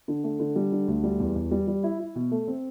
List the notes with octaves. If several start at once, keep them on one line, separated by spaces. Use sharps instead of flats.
D3
A3
D3
G3
D3
D2
G3
E2
E2
G3
G3
E4
E4
B2
A3
C4